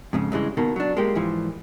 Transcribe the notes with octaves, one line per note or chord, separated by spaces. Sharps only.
F2 G#2 C#3
G2 C#3 E3 G#3
B2 D#3 A#3
F#3 D4
G#3 A#3 G4
G#2 E3 F3